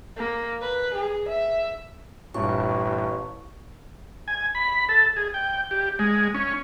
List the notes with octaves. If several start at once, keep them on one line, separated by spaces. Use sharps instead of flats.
A#3
B4
G#4
E5
A1 G2 A#2 C#6
G#5
B5
A4
G#4
G5
G4
G#3
C#4